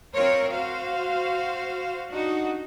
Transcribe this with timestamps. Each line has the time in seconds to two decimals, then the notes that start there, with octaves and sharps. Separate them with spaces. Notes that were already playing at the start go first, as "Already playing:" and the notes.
0.14 C4 F4 A#4 C5 C#5
0.49 F#4 C5 F5
2.11 D4 D#4 F#4